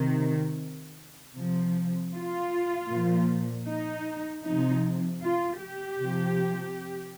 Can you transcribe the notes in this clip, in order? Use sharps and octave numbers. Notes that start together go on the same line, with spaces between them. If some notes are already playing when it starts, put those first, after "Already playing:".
Already playing: C3 D#3
C3 F3
F4
A#2 F3
D#4
C3 F3 D#4
F4
G4
C3 F3